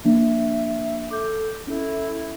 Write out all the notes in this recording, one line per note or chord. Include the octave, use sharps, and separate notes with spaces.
F3 A#3 D4 E5
A4 D6 G6
C#4 E4 A4